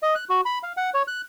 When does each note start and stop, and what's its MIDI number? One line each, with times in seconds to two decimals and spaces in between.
0.03 0.14 75
0.15 0.24 90
0.29 0.41 66
0.45 0.59 83
0.63 0.73 77
0.77 0.90 78
0.94 1.02 73
1.08 1.21 90